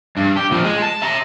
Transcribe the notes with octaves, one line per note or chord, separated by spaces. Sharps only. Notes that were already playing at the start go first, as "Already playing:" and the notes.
G2
G4
A#2 F3
G#3
A5
E5 A#5